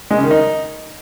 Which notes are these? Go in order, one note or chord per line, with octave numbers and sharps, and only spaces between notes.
G#3
C#3
D#3
D#4